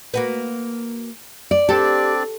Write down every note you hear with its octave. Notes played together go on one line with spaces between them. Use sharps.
A#3 F#4 B4
D5
C4 D4 G4 A4 D5